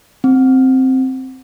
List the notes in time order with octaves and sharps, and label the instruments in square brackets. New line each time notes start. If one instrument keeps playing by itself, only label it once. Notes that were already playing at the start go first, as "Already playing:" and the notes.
[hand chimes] C4